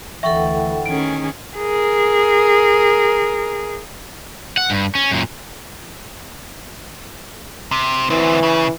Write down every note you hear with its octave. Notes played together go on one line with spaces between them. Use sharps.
D2 E3 A4 E5 F#5 G5 C#6
D#3 C#4 G#4 D7
G#4 A#4
F#5
G2
C#4
F#2 A#2
C3
D2 E3 C4
C#3